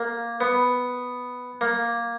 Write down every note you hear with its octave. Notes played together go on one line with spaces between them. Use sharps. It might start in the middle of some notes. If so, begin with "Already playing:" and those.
Already playing: A#3
B3
A#3